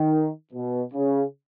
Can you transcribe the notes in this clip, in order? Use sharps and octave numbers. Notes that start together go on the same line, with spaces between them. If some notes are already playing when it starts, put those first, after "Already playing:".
Already playing: D#3
B2
C#3